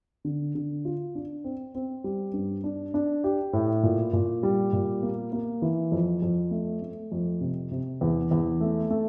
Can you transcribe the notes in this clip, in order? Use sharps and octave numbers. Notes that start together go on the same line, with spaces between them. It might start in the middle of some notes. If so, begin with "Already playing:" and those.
D3
D3
F4
D4
C4
C4
G3
G2
D4
D4
G4
A2
A#2
A#2
G3
A#2
A#3
A#3
E3
F2
F2
A3
A3
F2
C3
C3
E2
E2
A3
A3